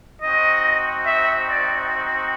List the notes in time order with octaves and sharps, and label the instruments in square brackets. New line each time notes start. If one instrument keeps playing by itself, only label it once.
[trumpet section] C4 D#4 F#4 D#5
E5
D5